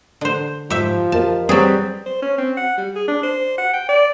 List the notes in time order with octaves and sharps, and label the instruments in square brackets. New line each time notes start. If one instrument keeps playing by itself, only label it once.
[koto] D3 C5
[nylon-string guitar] G#2 [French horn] F3 [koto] G4 E5
[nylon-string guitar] G4 A#4 D#5 [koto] A5
[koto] F#3 G#4 [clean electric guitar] G3 C4 [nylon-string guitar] B4 D5
[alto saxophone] C5
C#4
C4
F#5
G3
G#4
D4
C5
F#5
G5
D5